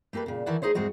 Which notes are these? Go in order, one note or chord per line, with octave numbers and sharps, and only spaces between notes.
A3 A#3 G4 A4 B4
A#2 C#3
D#3 E3 E5 F#5 A5
A3 D#4 G#4 C5 C#5
D2 G#2 G#3 C4 F#4 D#5